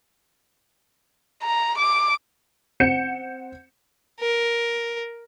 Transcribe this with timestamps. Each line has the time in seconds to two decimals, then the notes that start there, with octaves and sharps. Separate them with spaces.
1.43 A#5
1.78 D6
2.80 C4 F#5 G6 C#7 E7
4.20 A#4